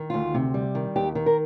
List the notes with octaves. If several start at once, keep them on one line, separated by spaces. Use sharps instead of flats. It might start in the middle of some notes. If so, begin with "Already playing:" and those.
Already playing: D#3
D2 F4
C3
G3
D#3
D#2 G4
D#3
A#4